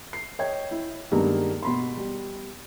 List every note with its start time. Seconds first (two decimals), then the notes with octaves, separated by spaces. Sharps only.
0.13 C7
0.39 C#5 D#5 G5 G#6
0.71 E4
1.11 G2 D#3 G#3 A#3 B3
1.63 B2 B5 C6
1.97 G3